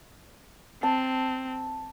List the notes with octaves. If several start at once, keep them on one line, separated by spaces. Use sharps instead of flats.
C4 A5